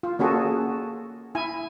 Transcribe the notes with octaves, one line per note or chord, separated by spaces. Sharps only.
F4
A#3 C#4 F#4 G#4 A4
E4 G#5